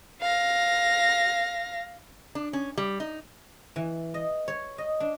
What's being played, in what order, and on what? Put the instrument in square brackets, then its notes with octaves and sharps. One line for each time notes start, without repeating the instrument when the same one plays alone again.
[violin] F5 A#6
[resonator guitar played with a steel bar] D4
C#4
G3
D#4
[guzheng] E3
D#5
C#5
D#5
D4